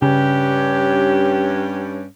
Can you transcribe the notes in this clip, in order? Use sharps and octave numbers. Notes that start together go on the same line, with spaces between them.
G2 C#3 C#4 G4